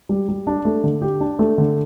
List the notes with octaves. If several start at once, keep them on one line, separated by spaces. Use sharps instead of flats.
G3
G3
D4
A3
D3
G4
D4
A3
D3